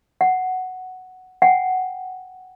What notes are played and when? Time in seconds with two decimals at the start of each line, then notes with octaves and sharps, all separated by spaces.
0.21 F#5
1.42 F#5 G5